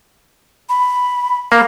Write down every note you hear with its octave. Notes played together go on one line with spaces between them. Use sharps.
B5
A#3 F5